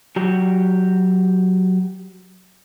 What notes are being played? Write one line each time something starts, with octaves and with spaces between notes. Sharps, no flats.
F#3 F#4 G4